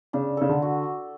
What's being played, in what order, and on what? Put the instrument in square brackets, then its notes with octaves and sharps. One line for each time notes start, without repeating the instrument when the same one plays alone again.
[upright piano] C#3 [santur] D4
[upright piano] C#3 [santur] A4
[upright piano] D3
[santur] F#4